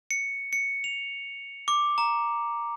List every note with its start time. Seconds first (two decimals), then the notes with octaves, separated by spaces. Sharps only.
0.11 C#7
0.53 C#7
0.84 F7
1.68 D6
1.98 A#5